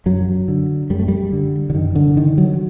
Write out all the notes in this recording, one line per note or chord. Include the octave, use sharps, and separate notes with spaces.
F#2 F#3
D3
F#2 G3
A3
G3
D3
D3
F#2 D#3
D3
D3 D#3
F#3